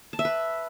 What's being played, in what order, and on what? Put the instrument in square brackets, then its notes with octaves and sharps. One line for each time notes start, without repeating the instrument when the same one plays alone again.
[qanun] A5
E5
B4